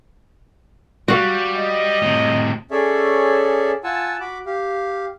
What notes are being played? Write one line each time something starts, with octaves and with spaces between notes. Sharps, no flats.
G3 F#4 F5
D#5
A2 C3
C#4 G#4 A4 C#5 D5 E5
F4 F#5 G#5 A5 E6
F#4 B5 D6
G4 F5